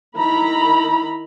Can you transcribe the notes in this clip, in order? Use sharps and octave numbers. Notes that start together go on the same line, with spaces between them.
D#3 E4 A#5 B5